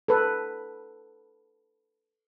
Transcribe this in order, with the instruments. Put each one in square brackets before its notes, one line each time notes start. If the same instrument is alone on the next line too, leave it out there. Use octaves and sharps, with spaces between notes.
[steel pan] A4 B4